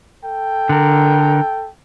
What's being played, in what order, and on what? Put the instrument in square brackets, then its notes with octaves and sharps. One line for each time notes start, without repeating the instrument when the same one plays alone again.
[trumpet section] A4 G5
[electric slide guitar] D3 A#4